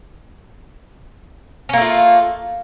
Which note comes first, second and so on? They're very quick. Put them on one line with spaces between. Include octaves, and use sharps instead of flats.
C#4 A#3 A3 F4